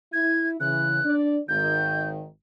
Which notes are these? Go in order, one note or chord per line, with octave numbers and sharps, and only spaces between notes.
E4 G#6
C#3 E3 F#6
D4 D5
G#1 D#3 G6